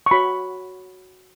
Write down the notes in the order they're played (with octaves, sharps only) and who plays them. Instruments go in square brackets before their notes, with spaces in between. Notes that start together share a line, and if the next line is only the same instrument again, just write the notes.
[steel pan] C#6
F#4 C#5 B5